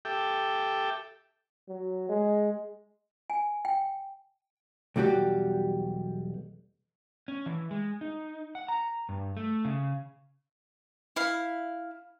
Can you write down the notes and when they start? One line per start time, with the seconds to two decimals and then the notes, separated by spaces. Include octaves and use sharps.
0.05 G4 A4 E5 G5 D6
1.69 F#3
2.09 G#3
3.30 G#5
3.65 G5
4.96 B1 E2 G3 F#4 G4
7.28 C#4
7.46 E3
7.71 G#3
8.01 D#4
8.55 F#5
8.68 A#5
9.09 G2
9.37 A3
9.65 C#3
11.16 E4 F5